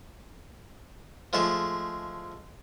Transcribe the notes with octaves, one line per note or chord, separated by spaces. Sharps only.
F3 G#3 A3 A5